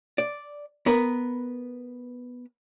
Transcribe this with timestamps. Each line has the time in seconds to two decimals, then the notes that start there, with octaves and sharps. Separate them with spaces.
0.18 D5
0.86 B3 A#4 B4